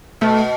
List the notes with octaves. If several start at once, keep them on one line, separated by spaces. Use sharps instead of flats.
B2 A3